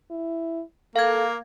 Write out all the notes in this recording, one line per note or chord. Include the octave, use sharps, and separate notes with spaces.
E4
A#3 A4 F5 G#6